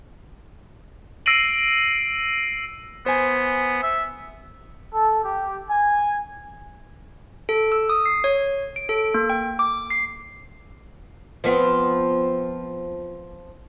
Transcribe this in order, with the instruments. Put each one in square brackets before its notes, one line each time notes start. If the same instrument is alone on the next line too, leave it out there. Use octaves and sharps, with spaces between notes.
[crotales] E6 A#6 C7 D7 D#7 F#7
[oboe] B3 [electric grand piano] C5 G#5
[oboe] E5
[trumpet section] A4
G4
G#5
[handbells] A4
E6
D#6
C7
C#5
D7
A4
A#3
G5
D6
C7
[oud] F3 B3 C4